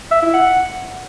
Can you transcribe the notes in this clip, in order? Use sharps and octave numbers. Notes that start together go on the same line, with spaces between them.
E5
E4
F#5